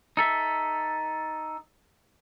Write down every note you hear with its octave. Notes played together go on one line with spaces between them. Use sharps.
D#4 A4 E5